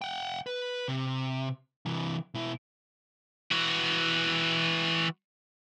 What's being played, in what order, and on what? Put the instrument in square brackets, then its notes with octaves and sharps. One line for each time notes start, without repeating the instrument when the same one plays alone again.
[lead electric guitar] F#5 G5
B4
C3
C3 E3
B2 E4
[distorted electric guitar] E3 F#4